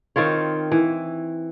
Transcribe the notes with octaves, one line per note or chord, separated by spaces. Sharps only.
D#3 C4 F4 C#5
E3